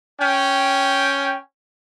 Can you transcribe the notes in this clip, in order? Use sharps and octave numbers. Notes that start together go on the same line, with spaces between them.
C#4 G5